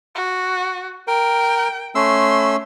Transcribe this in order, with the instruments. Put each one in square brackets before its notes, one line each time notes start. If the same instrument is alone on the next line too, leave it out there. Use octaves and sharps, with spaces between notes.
[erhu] F#4
[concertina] A#4 [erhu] G5
[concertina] A3 C#4 E6 [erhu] C6